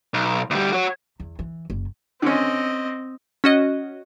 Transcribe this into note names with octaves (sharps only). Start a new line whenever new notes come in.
B1
D2 G3
F#4 C#5
E2
E3
F#1
D3 C4 C#4 D#5
C#4 F#4 D#5